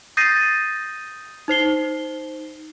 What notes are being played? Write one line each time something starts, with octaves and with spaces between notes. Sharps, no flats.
D#6 G6 A6 A#6 C7 D#7
D#4 C5 C7 G7